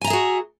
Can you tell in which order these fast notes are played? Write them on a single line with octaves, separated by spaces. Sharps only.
G#5 A#5 E5 G#4 F#4